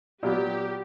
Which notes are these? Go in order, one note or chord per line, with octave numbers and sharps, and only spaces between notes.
A#2 F#3 B3 G4